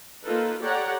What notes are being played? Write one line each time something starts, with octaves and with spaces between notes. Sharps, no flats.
A#3 D#4 F4 A4 B4
G4 A4 C#5 D5 F#5 A#5